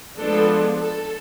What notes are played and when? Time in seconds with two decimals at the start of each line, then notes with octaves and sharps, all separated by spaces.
0.17 F3 G#3 B3 D4 A4
0.79 A4